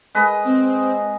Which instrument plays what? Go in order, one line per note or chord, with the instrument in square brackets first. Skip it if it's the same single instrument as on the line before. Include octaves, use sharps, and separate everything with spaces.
[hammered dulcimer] G#3 B4 D#5
[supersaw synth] C4